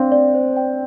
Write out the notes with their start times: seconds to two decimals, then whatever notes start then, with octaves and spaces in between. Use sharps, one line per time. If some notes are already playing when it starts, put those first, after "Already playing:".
Already playing: C4 D4 D5 F5
0.12 D5
0.34 C5
0.57 G5